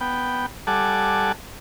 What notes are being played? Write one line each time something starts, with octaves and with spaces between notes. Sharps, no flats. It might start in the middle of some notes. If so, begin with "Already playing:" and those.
B3 G5
G3 A4 F#5 G#5 A5 D6